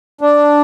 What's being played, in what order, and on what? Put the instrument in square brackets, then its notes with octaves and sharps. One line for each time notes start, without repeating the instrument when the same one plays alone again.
[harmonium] D4